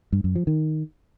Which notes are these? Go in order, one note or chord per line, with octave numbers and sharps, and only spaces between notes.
G2
F#2
F3
D#3